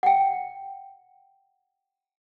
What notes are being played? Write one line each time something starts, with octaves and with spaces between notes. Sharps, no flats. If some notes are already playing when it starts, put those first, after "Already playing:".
F#5 G5